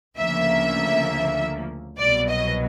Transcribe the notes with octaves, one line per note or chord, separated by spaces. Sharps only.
D2 C#3 F3 A#3 E5
C2 B2 F#3 D5
D#5